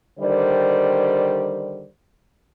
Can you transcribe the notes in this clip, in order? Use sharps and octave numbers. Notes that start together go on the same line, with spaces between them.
D3 D#3 G3 C5 D5